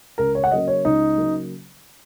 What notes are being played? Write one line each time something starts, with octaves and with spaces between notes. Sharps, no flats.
C#2 A#4
C#5
F#5
C#3 F#3 A#3 D#5
C#5
C#2 D#4
C#3 F#3 A#3